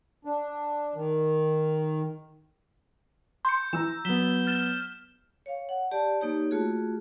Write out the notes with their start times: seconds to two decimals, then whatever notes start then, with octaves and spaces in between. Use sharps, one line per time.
0.25 D4
0.95 D#3
3.45 C6 G6 C#7
3.73 E3 A#5 E6 E7
4.05 F#3 B3 B6 E7 G7
4.47 F6 A6 E7
5.46 C#5 F5
5.69 F#5
5.91 G4 D5 A5
6.20 A#3 D#4 G4 C#5
6.51 A3 F4 F#4 G#4